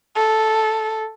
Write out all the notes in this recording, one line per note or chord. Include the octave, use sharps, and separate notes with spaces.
A4